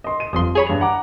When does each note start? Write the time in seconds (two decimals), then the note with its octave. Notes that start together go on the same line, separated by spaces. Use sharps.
0.04 D#5 C6
0.20 D#7
0.33 G1 F2 C6 D#6
0.55 G#4 C#5 B5
0.67 G2 F7
0.81 F#5 A#5 D6